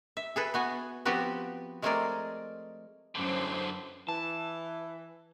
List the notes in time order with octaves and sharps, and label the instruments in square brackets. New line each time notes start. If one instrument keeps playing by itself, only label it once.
[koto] E5
G#4 A4 B4
B3 F#4 G#5
F3 B3 C4 F#4 G4 B4
G#3 A3 C4 G#4 A#4 D5
[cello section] F#2 C5 [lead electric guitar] D3 E3
[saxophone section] E3 [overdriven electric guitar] A5